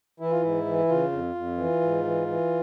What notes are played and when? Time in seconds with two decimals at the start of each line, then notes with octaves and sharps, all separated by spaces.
0.20 E3 E4
0.31 F4
0.42 G#2 E4
0.66 E3
0.89 C#3 F4
1.12 F2
1.35 F2
1.57 E3
1.81 G#2
2.04 E3
2.27 E3